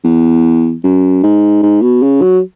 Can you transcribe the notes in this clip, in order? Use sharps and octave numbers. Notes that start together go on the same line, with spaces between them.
E2
F#2
G#2
G#2
B2
C#3
F#3